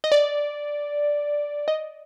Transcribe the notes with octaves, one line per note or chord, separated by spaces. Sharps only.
D#5
D5
D#5